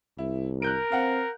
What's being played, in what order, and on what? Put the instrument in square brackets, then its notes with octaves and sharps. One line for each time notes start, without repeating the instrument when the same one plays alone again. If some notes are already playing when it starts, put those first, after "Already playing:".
[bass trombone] C2 [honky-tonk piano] E4
[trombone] A#4 [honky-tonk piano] F#6 G6 D7
[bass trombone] C4 [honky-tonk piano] F5 F#5